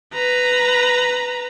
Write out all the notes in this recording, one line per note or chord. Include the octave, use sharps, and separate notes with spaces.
B4 A#5